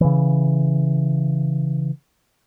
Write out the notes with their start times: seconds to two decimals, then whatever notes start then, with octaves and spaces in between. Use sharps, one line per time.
0.01 C#3 E3